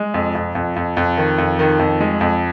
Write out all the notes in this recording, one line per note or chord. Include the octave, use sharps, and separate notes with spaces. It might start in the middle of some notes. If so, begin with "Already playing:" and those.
Already playing: G#3
F2
F2
F2
F2
F2
D#3
F2
D#3
F2
G#3
F2